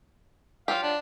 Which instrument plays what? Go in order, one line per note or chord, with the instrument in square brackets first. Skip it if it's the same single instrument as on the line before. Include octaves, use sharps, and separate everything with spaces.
[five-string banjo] F#3 F4 G4 [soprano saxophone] F5
[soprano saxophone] D4